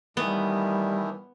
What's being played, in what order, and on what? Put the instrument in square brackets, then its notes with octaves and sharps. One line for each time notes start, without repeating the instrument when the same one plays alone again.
[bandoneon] A2 D#3 E3 [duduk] G3 [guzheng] B3